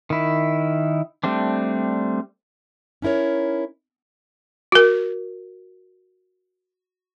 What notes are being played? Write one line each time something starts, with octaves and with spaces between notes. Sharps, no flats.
D#3 E4
G3 A3 C4 D4
C#4 D#4 E4 A#4 C#5
F#4 A#4